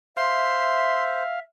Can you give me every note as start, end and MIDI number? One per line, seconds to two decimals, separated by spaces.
0.17 1.23 72
0.17 1.42 76
0.17 1.40 77
0.17 1.03 84